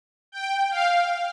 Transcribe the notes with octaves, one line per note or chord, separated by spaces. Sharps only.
G5
F5